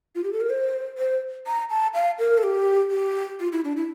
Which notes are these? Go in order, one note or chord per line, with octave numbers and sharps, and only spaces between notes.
F4
G4
A4
A#4
C5
C5
A#5
A5
F5
A#4
A4
G4
G4
F4
E4
D4
E4